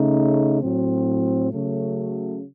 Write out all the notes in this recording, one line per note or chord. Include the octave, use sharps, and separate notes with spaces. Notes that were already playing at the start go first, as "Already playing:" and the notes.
Already playing: C#3 A3 D#4
A2 F#3 C4
C#3 F#3 A3